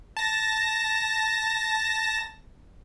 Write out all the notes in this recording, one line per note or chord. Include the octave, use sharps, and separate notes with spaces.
A5 A#6